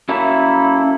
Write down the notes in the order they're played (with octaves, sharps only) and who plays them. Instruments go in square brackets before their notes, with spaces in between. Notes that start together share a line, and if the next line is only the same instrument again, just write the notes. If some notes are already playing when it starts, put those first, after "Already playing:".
[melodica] A#3 E4 A4 [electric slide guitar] C#4 F#4 E5